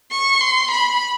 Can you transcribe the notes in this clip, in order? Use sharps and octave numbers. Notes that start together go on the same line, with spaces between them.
C#6
C6
B5